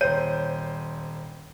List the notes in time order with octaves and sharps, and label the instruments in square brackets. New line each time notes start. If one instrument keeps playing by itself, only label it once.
[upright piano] D#1 C5 D#7 [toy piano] C#5